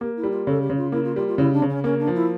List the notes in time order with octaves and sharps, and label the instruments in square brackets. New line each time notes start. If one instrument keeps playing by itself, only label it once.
[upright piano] A#3 [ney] G4
[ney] E4
[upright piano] G3
[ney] F4
[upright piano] C#3 [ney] A4
[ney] G4
[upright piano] C#3
[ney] F4
[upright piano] A#3 [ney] E4
[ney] F4
[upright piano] G3 [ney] F4
[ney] F4
[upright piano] C#3 [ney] E4
[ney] D4
[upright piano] C#3
[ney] C#4
[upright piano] A#3 [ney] C#4
[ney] D4
[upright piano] F3
[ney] E4